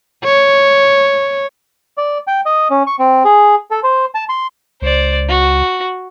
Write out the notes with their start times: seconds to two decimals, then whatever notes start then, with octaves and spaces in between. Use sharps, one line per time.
0.24 C#5
1.97 D5
2.27 G5
2.46 D#5
2.70 C#4
2.87 C#6
2.99 C4
3.25 G#4
3.71 A4
3.83 C5
4.15 A5
4.29 C6
4.82 C#2 C5 D5
5.29 F#4